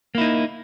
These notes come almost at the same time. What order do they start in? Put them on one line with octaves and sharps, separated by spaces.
A#3 E4 D#4